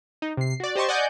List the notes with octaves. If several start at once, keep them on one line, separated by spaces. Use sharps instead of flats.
D#4
C3 C7
F#4 D5
G4 C5 D#5 A5 C6 C#6
D5 D#5 F#5 G#5 G6